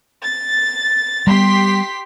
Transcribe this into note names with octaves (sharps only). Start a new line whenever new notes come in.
A6
G3 B3 G4 C6 B6